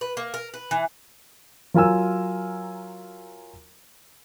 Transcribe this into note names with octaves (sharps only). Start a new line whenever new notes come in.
B4
A#3
A#4
B4
E3
F#3 F4 A#4 G#5 E6